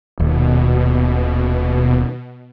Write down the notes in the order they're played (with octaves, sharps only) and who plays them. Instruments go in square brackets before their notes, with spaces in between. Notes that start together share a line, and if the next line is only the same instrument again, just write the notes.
[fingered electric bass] D#1 D#2 [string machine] B2